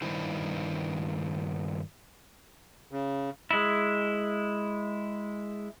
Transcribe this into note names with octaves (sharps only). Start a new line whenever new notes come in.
G2 D#3 E4 C5
C#3
G#3 E4